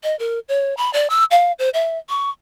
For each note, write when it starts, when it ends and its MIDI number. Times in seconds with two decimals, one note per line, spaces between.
0.03 0.17 75
0.19 0.39 70
0.49 0.76 73
0.77 0.92 83
0.93 1.07 74
1.10 1.24 88
1.31 1.52 77
1.59 1.70 72
1.74 1.98 76
2.09 2.30 85